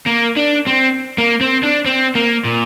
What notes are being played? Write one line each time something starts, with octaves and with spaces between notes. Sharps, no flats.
A#3
D4
C4
A#3
C4
D4
C4
A#3
A#2